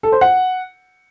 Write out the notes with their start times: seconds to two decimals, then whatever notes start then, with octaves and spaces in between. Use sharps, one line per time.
0.03 A4
0.12 C5
0.21 F#5